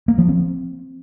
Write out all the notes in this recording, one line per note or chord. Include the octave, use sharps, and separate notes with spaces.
A#3
F3
C4